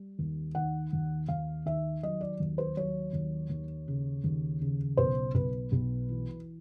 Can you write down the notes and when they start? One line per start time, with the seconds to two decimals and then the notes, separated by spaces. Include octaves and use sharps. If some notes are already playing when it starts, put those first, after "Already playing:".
Already playing: G3
0.19 D#2
0.55 D#3 F#5
0.93 D#2
1.28 D#2 F5
1.66 D#3 E5
2.03 F#3 D#5
2.21 D5
2.40 D#2
2.58 C5
2.77 F#3 C#5
3.13 D#2
3.50 D#2
3.88 C#3
4.24 D#2
4.61 C#3
4.97 B1 C5
5.34 B1 B4
5.72 B1
6.09 E3